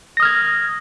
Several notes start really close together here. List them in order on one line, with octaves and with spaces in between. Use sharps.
A#6 D#6 F6 G#6